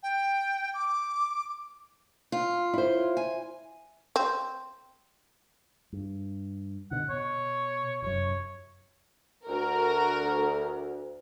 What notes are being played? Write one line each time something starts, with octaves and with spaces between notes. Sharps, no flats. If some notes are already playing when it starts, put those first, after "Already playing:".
G5
D6
F4
E4 C5
G#5
C4
G2
B2 D3 F#5
B2 C#5
F1 F#2 C#5
D2 F#4 A#4